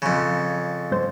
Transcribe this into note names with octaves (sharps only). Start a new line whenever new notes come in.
F2 C#3
G#1 C5